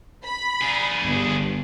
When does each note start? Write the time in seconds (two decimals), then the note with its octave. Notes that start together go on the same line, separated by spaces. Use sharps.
0.25 B5
0.61 D4 G#4
1.03 G1